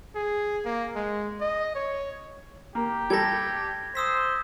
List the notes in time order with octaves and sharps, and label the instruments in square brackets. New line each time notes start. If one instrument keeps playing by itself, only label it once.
[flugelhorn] G#4
A#3
G#3
D#5
C#5
[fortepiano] A#3 [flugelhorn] G4
[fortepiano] G3 A4 [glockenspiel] G#6 A#6
[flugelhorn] C5 [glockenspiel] D#6 E6 B6